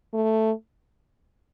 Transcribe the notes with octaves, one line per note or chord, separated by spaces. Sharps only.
A3